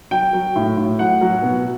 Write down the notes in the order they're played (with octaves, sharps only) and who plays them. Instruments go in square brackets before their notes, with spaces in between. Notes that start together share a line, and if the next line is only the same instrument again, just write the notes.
[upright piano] F#3 G5
F#3
A2
A2
F#3 F#5
F#3
B2